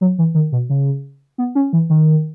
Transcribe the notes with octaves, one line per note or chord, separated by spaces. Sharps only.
F#3
E3
D#3
B2
C#3
B3
C#4
E3
D#3